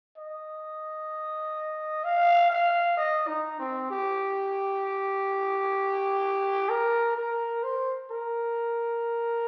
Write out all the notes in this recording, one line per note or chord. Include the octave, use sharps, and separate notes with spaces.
D#5
F5
F5
D#5
D#4
C4
G4
A#4
A#4
C5
A#4